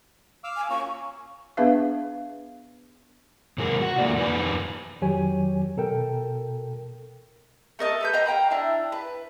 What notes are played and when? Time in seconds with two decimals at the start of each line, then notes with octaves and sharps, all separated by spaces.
0.44 F5 D6 E6
0.56 G#5
0.70 A#3 C#4 F4 C#6
1.57 B3 D4 G#4 B4 E5 F5
3.58 C3 D#3 G#3 G#4 A#4
3.81 F#4 F#5
3.98 E2 D3 A3 A#3 D5
4.17 F2 D#4 G4 B4 G#5
5.01 F2 D#3 F#3 G4 C#5 G#5
5.77 B2 A4 A#4 G5
7.79 A3 A#4 D#5 A5
8.01 A4 B4 G6
8.13 D#5 F5 G5 A#5
8.26 F5 G5 A#5 B5
8.51 D4 E4
8.92 B4